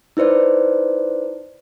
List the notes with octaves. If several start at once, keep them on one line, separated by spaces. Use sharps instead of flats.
D#4 E4 B4 C5 D5